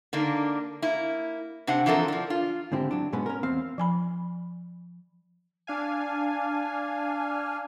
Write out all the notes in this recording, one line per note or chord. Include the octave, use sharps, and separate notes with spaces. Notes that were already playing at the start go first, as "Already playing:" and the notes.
D3 A#3 D4 D#4
A#3 E4
C3 D4 C5 F#5
E3 F3 C4 A4 A#4
F3 D4
F4
G#2 D3 C4 E4 G4
F#3 D4
G#2 B2 G#3 B3 C#4
C#4 A#4
E2 C4 F5
F3 G#5 B5
D4 F5 G#5